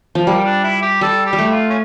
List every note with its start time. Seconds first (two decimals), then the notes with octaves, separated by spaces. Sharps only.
0.15 F3
0.27 G3 A#3
0.46 D4
0.64 E4
0.82 G4
1.01 G3 A4
1.26 G4
1.33 G3
1.38 A3
1.51 F4
1.69 C#4